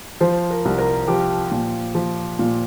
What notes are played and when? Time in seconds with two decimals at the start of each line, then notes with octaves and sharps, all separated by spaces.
0.20 F3 C5
0.50 A#4
0.65 C2
0.78 A#4
1.08 F3 G4
1.52 A#2
1.95 F3
2.39 A#2